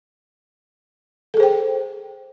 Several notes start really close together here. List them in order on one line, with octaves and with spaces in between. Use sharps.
A4 G#4 C5 G5